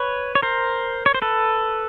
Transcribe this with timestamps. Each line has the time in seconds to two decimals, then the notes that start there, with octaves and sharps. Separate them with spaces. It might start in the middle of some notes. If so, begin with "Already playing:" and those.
Already playing: B4 C#5
0.35 C#5
0.42 A#4 C5
1.06 C#5
1.14 C5
1.22 A4 B4